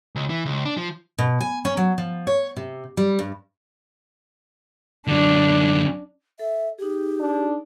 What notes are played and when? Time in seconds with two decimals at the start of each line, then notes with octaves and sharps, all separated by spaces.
0.16 C#2
0.30 E3
0.46 C#2
0.65 D4
0.77 F3
1.18 B2
1.41 G#5
1.65 C#4
1.77 F#3
1.98 F3
2.27 C#5
2.56 C3
2.97 G3
3.19 G2
5.08 F#2 D3 D4
6.39 A4 E5
6.79 D#4 G4 G#4
7.20 D4